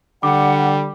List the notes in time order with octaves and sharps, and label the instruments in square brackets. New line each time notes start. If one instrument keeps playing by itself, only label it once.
[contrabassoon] D3 [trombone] G3 [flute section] F#5 [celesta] D6